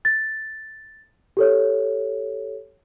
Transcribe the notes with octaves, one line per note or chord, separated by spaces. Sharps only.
A6
G4 A4 C#5